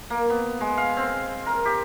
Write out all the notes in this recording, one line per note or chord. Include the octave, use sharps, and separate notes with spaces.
A#3
B3
G#3
F5
C4
A#4
G4